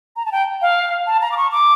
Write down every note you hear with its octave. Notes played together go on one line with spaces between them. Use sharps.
A#5
A5
G5
F5
A5
A#5
D6
C#6
D6